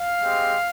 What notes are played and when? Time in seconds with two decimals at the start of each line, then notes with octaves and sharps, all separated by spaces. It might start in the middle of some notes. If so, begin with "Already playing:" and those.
Already playing: F5
0.21 G#3 C4 G4